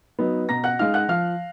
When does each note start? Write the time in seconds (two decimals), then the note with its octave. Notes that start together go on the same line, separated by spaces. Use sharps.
0.19 F#3 B3 D#4
0.49 B2 A#5 A#6
0.64 F#5 F#6
0.79 G#3 D#4 F5 F6
0.94 F#5 F#6
1.09 F3 F5 F6